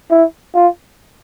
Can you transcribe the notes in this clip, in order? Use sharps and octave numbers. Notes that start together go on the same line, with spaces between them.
E4
F4